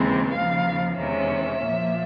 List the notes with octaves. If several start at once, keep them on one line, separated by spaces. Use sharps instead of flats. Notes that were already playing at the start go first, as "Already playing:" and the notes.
Already playing: D#2 C#3 E3 G#3 C4
D#2 C#3 F3 F5
E2 C3 D#3 G#3 C#4 E5
A#2 F3 A#3